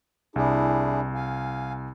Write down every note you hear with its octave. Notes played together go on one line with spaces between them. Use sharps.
C2 D4 E4 G#4
F5 G#5